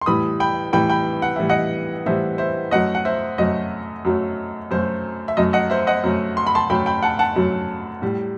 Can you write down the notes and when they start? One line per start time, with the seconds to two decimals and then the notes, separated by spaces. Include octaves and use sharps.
0.01 C6
0.06 A2 E3 G3 B5 D#6
0.40 G5 B5
0.73 A2 E3 G3 G5 B5
0.89 G5 B5
1.22 F#5
1.36 A2 E3 G3 E5
1.49 D#5 F#5
2.06 A2 E3 G3 C5 E5
2.38 C5 E5
2.71 F#2 F#3 A3 D#5 F#5
2.95 F#5
3.05 C5 E5
3.38 F#2 F#3 A3 D#5
4.05 F#2 F#3 A3
4.71 F#2 F#3 A3 C5
5.28 E5
5.37 F#2 F#3 A3 D#5
5.53 D#5 F#5
5.70 C5 E5
5.87 D#5 F#5
6.04 F#2 F#3 A3
6.37 C6
6.47 B5
6.55 A5 C6
6.70 F#2 F#3 A3 G5 B5
6.86 G5 B5
7.03 F#5 A5
7.19 F#5 A5
7.36 F#2 F#3 A3
8.02 A2 G3